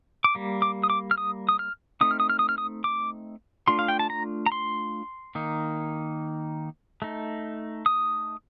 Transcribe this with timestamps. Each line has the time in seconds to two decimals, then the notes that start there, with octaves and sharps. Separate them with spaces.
0.24 D6
0.35 G3 A#3
0.62 D6
0.83 D#6
0.90 D6
1.11 F6
1.18 D#6
1.49 D#6
1.59 F6
2.01 A3 C4 D#4 D#6
2.11 F6
2.20 D#6
2.30 F6
2.39 D#6
2.49 F6
2.58 D#6
2.84 D6
3.68 A3 D4 F4 C6
3.79 F5
3.88 G5
3.99 A5
4.10 A#5
4.46 A#5
4.52 C6
5.35 D#3 A#3 D#4
7.02 A3 D#4
7.86 D#6